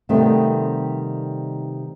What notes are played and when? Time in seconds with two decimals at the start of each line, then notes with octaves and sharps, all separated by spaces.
0.09 C3 D#3 G3 A3 B3 C4